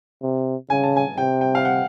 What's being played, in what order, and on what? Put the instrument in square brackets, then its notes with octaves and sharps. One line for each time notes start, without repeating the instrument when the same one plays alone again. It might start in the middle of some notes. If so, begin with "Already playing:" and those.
[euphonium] C3
[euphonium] C#3 [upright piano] G#5
[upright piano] A5
G#5
[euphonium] C3 [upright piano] G5
[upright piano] G5
F5
F#5